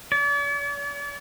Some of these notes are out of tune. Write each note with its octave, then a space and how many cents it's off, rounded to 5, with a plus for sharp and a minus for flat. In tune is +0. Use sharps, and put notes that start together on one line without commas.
D5 -45